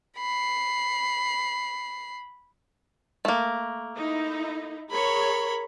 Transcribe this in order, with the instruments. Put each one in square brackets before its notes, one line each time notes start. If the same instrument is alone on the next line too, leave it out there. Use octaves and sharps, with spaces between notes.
[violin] B5 C7
[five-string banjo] A3 A#3
[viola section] D#4 E4
[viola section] G#4 C#5 [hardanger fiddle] A#4 B5